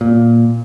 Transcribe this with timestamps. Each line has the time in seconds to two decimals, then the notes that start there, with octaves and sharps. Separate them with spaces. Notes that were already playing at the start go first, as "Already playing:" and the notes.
0.01 A#2